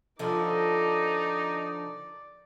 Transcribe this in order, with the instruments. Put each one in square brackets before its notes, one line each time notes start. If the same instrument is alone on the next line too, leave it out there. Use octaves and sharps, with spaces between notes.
[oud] D3 F3 [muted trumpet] D#4 [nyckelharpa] D5